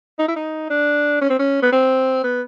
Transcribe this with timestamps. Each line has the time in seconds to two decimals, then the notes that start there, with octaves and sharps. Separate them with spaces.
0.19 D#4
0.28 E4
0.36 D#4
0.70 D4
1.21 C#4
1.30 C4
1.39 C#4
1.62 B3
1.72 C4
2.23 B3